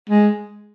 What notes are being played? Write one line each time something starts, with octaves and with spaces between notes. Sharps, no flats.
G#3